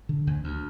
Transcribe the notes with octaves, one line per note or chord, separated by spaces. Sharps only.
D3
D2
D2